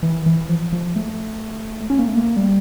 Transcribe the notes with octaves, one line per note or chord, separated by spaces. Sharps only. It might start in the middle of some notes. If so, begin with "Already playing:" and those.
E3
E3
F3
F3
A3
C#4
A#3
A3
A#3
G3